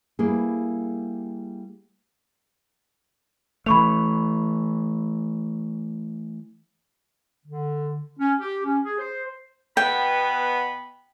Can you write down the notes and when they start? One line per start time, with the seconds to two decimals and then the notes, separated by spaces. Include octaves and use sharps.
0.19 G3 A#3 E4 G#4
3.66 E3 A3 B5 C#6 F7
7.46 D3
8.19 C#4
8.40 G4
8.64 C#4
8.85 G#4
8.99 C5
9.77 B2 B3 G5 B5